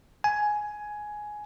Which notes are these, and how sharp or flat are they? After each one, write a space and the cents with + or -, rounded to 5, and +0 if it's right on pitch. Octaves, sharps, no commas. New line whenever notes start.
G#5 +10